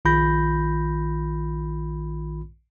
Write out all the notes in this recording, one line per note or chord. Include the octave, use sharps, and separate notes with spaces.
A#1 D#3 F4 B5 G6 A#6